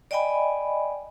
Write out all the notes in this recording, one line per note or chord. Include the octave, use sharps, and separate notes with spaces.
D5 D#5 G5 G#5 B5